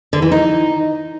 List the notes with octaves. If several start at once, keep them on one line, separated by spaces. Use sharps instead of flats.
D3
E3
D#4